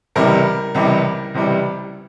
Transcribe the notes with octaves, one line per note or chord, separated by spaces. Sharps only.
C#2 C3 E3 G3 A#4
C#2 C3 E3 G3
C#2 C3 E3 G3